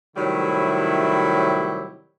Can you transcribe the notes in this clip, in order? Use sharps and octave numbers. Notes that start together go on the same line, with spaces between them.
A2 C3 D#3 F#3 G3 E4